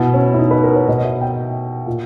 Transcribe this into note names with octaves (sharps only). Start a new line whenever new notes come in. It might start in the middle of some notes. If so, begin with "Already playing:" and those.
Already playing: B2 E4
C#4
E4
D#4
B4
A#4
C#5
B2 D#5
D#5
E5
G5
A#2